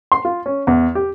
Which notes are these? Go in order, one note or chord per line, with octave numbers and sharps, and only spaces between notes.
C6
F4
C#4
E2
G4